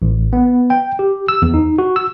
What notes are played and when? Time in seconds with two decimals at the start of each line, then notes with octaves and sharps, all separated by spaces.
0.02 A1
0.33 B3
0.70 G5
0.99 G4
1.28 E6
1.42 E2
1.54 D#4
1.78 F#4
1.96 E6